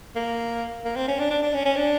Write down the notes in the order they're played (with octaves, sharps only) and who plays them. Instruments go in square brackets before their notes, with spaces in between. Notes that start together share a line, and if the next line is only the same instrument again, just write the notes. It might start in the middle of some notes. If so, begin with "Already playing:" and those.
[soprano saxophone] A#3
A#3
C4
C#4
D4
D4
D4
C#4
C#4
D4